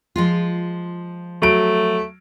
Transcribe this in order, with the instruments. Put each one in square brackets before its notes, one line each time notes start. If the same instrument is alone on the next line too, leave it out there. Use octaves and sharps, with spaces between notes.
[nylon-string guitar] F3 G#3 F4
[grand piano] F#3 D7 [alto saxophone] A3